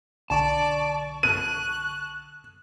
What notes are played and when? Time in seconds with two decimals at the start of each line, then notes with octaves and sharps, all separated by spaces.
0.30 B1 D3 D5 A5 C#6
1.23 F#6 D#7